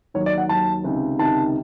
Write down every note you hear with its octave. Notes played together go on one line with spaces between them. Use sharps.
D#2 D#3 F#3 C#5
D5
F#5
D#2 D#3 F#3 A5
C#2 C3 D#3
C#2 C3 D#3 A5